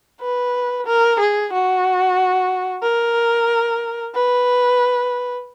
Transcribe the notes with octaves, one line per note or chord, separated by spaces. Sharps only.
B4
A#4
G#4
F#4
A#4
B4